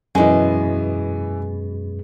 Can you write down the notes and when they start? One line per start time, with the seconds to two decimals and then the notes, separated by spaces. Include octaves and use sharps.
0.15 F#2 B2 E3 G#3 G#5